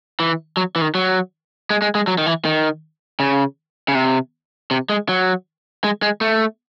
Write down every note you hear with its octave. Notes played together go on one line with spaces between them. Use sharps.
E3
F#3
E3
D#3
F#3
G#3
G#3
G#3
F#3
D#3
E3
D#3
C#3
C#3
C3
C3
G#3
F#3
G#3
G#3
A3